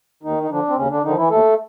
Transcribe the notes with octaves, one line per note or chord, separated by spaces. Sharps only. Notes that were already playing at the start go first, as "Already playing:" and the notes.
D#2 D#3 D#4
D#4
D3 F3 D4
C4
D#2 C#3 C#4
D3 D4
D3 D#3 F3 D#4
E3 E4
D#2 A3 A4